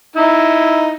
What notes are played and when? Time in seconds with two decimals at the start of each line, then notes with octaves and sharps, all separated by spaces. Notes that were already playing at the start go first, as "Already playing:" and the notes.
0.16 D#4 E4